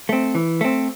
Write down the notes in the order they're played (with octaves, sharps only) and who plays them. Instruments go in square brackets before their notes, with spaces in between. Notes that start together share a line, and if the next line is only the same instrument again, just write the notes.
[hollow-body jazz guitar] A3 C4
E3
A3 C4